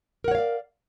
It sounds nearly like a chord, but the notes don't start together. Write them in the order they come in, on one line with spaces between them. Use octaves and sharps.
A#4 F#5 C#5 F5 D5